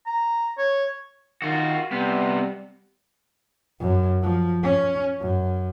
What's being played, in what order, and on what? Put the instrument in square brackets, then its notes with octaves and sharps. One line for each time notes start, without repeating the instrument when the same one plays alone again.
[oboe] A#5
C#5
[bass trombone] D#3 [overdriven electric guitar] F4 F#4
[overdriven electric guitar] C3 B3 [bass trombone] G3
[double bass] F#2
F3
C#4
F#2